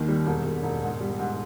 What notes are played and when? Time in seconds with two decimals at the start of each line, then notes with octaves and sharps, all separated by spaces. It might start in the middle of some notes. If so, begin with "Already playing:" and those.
Already playing: D#2 D#3
0.08 G3
0.27 E1
0.45 E1
0.63 E1
0.82 G#2
1.01 G3
1.19 G#2